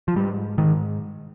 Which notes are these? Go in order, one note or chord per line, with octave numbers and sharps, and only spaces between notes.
F3
G#2 G3
G#2 D#3